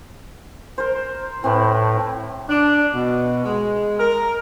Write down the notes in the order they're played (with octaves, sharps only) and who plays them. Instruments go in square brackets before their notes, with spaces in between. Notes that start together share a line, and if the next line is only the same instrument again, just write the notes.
[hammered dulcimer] A#4 C5
[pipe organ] A2 [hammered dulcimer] C4 B4
[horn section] D4
B2
G#3
A#4